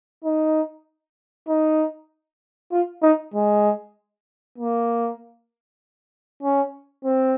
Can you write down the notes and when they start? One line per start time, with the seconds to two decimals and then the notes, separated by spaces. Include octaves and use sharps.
0.24 D#4
1.48 D#4
2.72 F4
3.03 D#4
3.34 G#3
4.58 A#3
6.43 C#4
7.05 C4